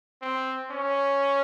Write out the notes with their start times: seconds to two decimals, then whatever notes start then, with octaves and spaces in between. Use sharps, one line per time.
0.22 C4
0.71 C#4